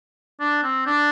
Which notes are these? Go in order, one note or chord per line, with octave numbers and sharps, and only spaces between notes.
D4
C4
D4